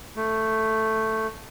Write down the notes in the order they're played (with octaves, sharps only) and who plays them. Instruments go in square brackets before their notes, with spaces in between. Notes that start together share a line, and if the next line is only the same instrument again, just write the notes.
[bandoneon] A3